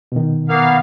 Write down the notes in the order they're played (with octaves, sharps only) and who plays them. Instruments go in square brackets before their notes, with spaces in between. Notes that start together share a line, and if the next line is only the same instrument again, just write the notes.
[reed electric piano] B2 D#3
[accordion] A#3 B3 F5